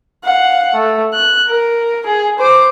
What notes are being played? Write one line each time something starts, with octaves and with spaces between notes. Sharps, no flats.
F5 F#5
A3
F#6
A#4
G#4
C5 D6